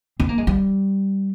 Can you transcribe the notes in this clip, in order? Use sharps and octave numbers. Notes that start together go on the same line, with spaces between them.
C4
A#3
G#3
G3